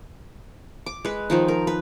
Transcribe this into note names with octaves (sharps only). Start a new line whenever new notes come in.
D6
G#3 B4
D#3 F3 D#4
A#4
B4